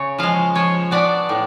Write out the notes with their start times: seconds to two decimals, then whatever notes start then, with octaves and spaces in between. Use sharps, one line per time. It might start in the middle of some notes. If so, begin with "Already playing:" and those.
Already playing: C#3 C#5
0.18 F3 G#3 F5
0.55 F3 C#5
0.91 B3 D4 D5
1.29 A2